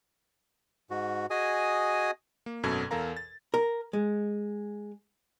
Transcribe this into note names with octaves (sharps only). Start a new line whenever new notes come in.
G#2 F#4
F#4 G#4 D#5 G#5 D#6
A#3
G#1 F#2 B2 A4 G#6
E2 A4 A#4 F5 A#5
A6
A#4
G#3